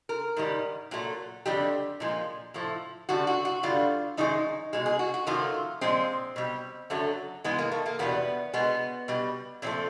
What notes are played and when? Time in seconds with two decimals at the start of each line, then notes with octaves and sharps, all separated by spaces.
0.09 A#4
0.37 G#2 D#3 G3
0.91 A#2 F#3 A3
1.46 F2 D3 G3 G4
2.00 A#2 F3 G#3
2.54 A2 F3 A3
3.09 F#2 D3 G3 F#4
3.27 F#4
3.45 F#4
3.63 G2 D3 G3 F4
4.17 F#2 D#3 G#3 D#4
4.73 B2 G#3
4.86 G#4
4.99 F#4
5.14 F#4
5.27 F#2 D#3 F#3 A3 F4
5.81 A#2 F3 G#3 C4
6.36 B2 G3
6.90 F#2 D3 F#3 A3
7.44 G#2 E3 G#3 B3
7.59 A#3
7.72 A3
7.86 A#3
7.99 E2 B2 G3 B3
8.53 B2 G#3 B3
9.08 B2 G3
9.62 A#2 F3 A3 C4